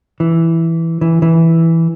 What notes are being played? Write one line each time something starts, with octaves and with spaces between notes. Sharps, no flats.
E3
E3
E3